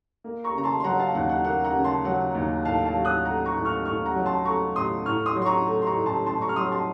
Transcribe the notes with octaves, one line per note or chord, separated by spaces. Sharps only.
A#3
A#5 C#6
C#3 A#5
A5 C6
C6
F#3 F#5 A#5
F5 A5
D#2 F#5
F#5
A#3 F#5
F#5 A#5
C#3
A5 C6
F#3 F#5
D#2
A2 F5 A5
F5 A5
F#3
D#6 F#6
A3 F#5 A#5
A#5 C#6
A2
C#6 F6
A2 C#6 F6
F#5 A#5
F#3
A5 C6
A3 A#5 C#6
A2 C6 D#6
A2 C#6 F6
C6 D#6
F#3
C6
A#5 C#6
A3
C6
A#5 C#6
A2
A5 C6
A2 A5 C6
A#5 C#6
F6
F#3 C6 D#6
A5 C6